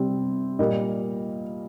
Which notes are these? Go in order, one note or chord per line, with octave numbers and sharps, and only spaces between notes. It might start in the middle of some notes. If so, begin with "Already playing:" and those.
Already playing: C3 G3 C4
A#2 G3 A#3 D#5